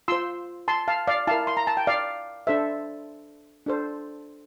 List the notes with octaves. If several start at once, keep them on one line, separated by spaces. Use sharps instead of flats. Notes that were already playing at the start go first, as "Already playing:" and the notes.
F4 C5 C6 E6
A5 C6
F5 A5
D5 F5
E4 A#4 F5 A5
C6
A#5
A5
G5
D5 F5
D4 A4 C5 E5
D4 A4 C5